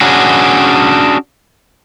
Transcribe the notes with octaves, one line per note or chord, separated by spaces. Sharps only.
C#4 D4 F#4 G#4